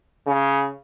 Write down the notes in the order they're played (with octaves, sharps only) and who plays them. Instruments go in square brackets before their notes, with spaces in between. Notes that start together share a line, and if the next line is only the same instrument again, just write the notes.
[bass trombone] C#3